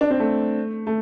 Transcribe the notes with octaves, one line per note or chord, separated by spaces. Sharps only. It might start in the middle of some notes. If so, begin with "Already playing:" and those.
D4
C4
A3
A3